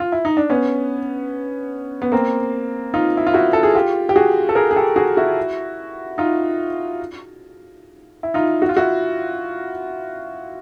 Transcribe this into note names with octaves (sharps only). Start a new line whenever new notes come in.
F4
E4
D#4
D4
B3 C#4
B3
A#3 C4
D#4 F4
E4
F4
E4 F#4
A4
G#4
F4 G4
G4
F#4 G#4
A4
G#4 A#4
G#4
G4 A4
F#4 G#4
E4 F#4
D#4 F4
E4
D#4 F4
F#4
F4
E4 F#4